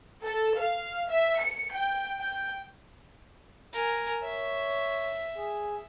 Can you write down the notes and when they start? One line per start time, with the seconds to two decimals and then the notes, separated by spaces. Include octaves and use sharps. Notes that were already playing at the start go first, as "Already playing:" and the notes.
0.22 A4
0.57 F5
1.08 E5
1.40 C#7
1.74 G5
2.20 G5
3.73 A#4 G#5
4.23 C#5 E5
5.37 G#4